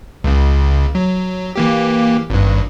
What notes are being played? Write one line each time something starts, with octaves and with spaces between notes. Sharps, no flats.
C#2 C#3
F#3
E3 A#3 G4
G#1 G2